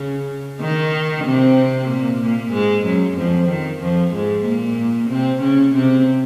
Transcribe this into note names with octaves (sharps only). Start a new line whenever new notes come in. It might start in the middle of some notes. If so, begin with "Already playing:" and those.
Already playing: C#3 C#4
D#3 D#4
C3 C4
A#2 A#3
A#2 A#3
G#2 G#3
F#2 F#3
F2 F3
D#3
F2 F3
G#2 G#3
A#2 A#3
C3 C4
C#3 C#4
C3 C4